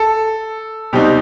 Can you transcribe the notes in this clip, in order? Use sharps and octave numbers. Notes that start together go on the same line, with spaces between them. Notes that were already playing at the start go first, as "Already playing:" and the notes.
Already playing: A4
B2 G3 C4 D#4 G4